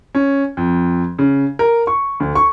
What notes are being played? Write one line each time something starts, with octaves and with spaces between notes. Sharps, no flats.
C#4
F2
C#3
A#4
C#6
D2
C#6